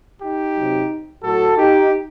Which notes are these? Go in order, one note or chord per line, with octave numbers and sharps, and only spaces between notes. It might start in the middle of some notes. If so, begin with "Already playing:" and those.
D#4 G4
C3 F#3
A2 F#3 F#4 A4
D#4 G4